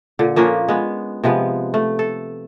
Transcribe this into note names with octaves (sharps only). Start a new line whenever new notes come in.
A#2 D3
F3 A#3 C#4 D4
G#3 B3
C3 F3 G#3 B3
A3
A4